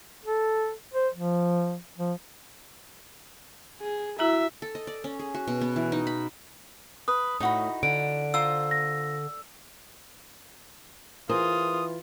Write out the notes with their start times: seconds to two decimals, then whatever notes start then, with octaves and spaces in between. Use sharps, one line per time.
0.24 A4
0.94 C5
1.14 F3
1.98 F3
3.81 G#4
4.19 E4 F#4 E5 A#5
4.62 A4
4.75 D#5
4.87 D5
5.04 C#4
5.19 G#4
5.34 F#4
5.48 B2
5.61 B3
5.76 E3
5.92 D#4
6.07 B5
7.08 B4 D#6
7.40 A2 D#4 F#4 B5
7.83 D3 D7
8.34 F4 C5 A#5 E6
8.71 A#6
11.29 E3 F4 G#4 A#4 C5 D#6